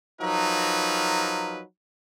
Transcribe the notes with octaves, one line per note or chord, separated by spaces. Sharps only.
F3 F#3 D#4 A#4 B4